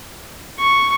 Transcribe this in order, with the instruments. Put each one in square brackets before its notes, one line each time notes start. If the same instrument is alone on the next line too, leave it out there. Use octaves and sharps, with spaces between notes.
[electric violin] C#6